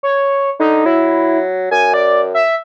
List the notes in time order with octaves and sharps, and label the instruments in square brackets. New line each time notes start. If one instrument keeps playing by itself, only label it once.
[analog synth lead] C#5
[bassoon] D3 [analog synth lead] D#4
[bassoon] F#3 [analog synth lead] E4
[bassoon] F#2 [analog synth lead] G#5
[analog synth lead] D5
E5